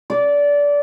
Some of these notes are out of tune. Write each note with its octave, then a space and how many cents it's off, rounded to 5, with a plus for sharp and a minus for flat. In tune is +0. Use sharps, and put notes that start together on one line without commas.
D5 -20